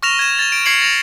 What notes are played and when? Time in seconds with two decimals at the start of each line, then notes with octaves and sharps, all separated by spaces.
0.03 C#6 F6 A#6 E7 F7
0.19 G#6 E7
0.39 A6 F7
0.52 D7
0.66 C#6 G#6 C7 C#7 F#7
0.82 A#6 F7